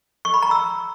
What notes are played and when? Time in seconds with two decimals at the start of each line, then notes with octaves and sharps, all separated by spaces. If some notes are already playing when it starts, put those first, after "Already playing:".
0.25 C#6
0.34 B5
0.42 A#5
0.51 E6